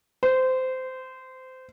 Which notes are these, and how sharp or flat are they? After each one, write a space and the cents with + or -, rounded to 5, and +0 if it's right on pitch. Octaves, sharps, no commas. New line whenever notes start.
C5 -20